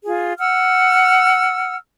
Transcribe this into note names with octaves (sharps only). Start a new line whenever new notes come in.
F4 G#4
F#5 E6 F6